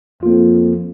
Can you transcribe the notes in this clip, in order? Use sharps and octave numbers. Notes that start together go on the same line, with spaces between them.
F2 A#3 F4